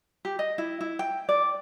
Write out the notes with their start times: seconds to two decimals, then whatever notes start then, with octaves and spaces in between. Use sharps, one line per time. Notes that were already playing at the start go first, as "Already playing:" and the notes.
0.25 G4
0.39 D#5
0.58 E4
0.81 E4
0.99 G5
1.29 D5